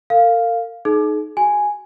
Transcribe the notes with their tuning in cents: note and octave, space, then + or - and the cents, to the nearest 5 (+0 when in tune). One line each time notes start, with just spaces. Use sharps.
A#4 -45 F5 +0
D#4 -10 G#4 +40
F#4 +25 G#5 +0